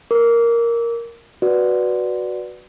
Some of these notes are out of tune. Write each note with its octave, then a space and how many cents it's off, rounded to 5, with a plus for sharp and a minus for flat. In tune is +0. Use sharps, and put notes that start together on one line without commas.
A#4 +0 D6 -30
F#4 +0 B4 +0 D5 +0